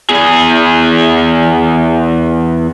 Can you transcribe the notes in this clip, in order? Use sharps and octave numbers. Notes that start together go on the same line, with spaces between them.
E2 G#4